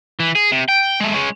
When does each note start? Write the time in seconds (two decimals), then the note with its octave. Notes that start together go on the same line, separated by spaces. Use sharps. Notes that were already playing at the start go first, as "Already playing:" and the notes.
0.20 E3
0.36 G#4
0.52 C3
0.69 G5
1.00 G#3 A3
1.14 G#3 C#4